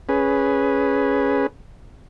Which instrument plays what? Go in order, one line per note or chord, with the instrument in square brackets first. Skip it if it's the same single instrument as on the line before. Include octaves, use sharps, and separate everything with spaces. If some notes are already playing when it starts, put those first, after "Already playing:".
[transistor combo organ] C#4 G#4 B4